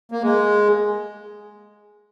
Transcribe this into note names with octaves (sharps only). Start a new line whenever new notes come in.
A#3
G#3